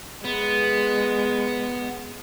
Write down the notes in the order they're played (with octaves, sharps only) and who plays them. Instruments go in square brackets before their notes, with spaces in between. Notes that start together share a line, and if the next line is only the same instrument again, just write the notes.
[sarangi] G#3 [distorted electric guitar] B3